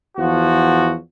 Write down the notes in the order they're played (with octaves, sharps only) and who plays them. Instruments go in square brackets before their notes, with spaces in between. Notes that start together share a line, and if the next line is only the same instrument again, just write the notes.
[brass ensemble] E2 F3 F#4